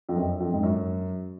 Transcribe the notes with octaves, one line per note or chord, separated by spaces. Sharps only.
F2
F#2
F2
G#2
F#2